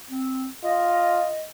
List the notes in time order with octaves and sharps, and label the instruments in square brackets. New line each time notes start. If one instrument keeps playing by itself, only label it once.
[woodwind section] C4
[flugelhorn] F4 [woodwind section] D#5